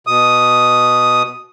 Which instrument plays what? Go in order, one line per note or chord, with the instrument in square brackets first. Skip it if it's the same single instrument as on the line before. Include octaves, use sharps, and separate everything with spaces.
[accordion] B2 D#6